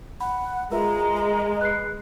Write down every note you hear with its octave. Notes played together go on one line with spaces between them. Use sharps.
F#5 B5
G#3 F4 A#4 B4 E5 A#5
D#5
B4 F#6 C7